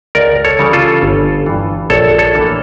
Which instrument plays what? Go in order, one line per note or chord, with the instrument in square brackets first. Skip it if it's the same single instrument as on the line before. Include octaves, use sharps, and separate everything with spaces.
[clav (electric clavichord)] C#2 A#4 D5
A4 C#5
C#3 E3 G3 C#4
F4 A4
G1
G2 E3
A#1 A4 C#5
A4 C#5
A2 E3 A#3 D4